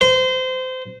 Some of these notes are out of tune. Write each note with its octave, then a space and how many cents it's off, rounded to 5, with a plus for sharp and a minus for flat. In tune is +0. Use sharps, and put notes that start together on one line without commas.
C5 -25